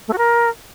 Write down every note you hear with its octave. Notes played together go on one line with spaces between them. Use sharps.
A3
F#4
A#4